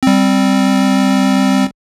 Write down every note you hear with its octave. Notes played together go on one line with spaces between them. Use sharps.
G3 C4